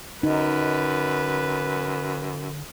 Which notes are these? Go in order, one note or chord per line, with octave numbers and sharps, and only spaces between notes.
F#2 D3 D#4 B4